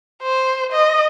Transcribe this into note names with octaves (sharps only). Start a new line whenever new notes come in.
C5
D#5